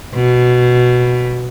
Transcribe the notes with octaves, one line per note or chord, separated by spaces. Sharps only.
B2